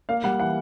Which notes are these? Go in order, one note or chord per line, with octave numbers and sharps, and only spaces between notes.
A#3 F5
G3 F#5
E3 F#5